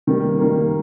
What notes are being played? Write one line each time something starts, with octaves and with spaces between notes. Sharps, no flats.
D#3 G3 A#3
D#3 G3 A#3